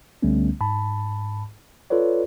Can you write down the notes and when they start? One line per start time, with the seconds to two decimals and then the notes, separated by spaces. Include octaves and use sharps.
0.22 C#2 D3 G3 A3 B3 C#4
0.61 G#2 A5 B5
1.90 F4 A4 B4 C#5 D5